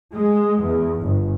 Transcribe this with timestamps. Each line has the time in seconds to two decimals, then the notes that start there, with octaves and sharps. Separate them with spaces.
0.14 G#3
0.63 E2
1.02 G1